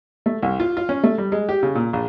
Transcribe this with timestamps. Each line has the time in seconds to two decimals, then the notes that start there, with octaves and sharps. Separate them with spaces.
0.26 A3
0.42 C2
0.60 F4
0.77 F4
0.89 C#4
1.04 A3
1.18 G3
1.32 G#3
1.49 G4
1.63 C#3
1.75 A#2
1.93 A#1